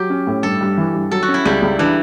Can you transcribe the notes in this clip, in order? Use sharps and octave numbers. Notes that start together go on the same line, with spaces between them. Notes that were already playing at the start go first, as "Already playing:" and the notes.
Already playing: F#3 G4
C#4
A2
G2 A4
G2
E3
G2
F#3 A4
F#4
C#4
E4
C#2 G3
C#2
E3 D4